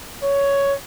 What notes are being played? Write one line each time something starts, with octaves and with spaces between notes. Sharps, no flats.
C#5